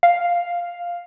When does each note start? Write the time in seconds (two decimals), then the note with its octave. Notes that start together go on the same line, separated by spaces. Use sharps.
0.03 F5